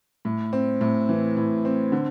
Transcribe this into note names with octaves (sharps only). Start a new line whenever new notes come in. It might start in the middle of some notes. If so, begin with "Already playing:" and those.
A2
C4
A2
E3
A2
C4
D3